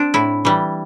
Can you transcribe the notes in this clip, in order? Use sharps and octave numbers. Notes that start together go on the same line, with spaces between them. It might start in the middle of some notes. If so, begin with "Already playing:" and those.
Already playing: C4 D4
A2 E4
E3 G3